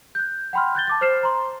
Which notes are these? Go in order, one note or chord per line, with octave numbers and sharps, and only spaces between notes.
F#6 G6
F#5 G5 B5 C6 F6
F#6 G6 A6 G7
A5 D6 A6
C5 F6 C7 E7
A#5 C6